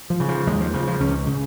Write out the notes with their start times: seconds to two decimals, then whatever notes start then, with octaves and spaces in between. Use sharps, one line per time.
0.10 F3
0.20 C#3
0.29 F3
0.47 D#2 G#3
0.60 F3
0.73 C#3 F3
0.87 F3
1.00 C#2 C#4
1.27 C#3